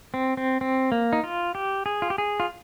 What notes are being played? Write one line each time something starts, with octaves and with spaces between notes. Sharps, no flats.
C4
C4
C4
A#3
D#4
F4
G4
G#4
F4
G4
G#4
F4